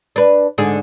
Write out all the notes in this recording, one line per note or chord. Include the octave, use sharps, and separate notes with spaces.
D4 B4
G#2 D3 G#4